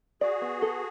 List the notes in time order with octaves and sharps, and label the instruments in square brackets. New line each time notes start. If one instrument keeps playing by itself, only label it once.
[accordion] F#4 G#4 [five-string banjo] D5
[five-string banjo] B3
A4